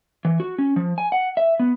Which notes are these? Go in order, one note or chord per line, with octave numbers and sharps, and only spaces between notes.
E3
F#4
C#4
F3
G#5
F#5
E5
B3